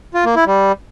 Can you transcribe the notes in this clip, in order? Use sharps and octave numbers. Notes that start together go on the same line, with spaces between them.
F4
A#3
E4
G3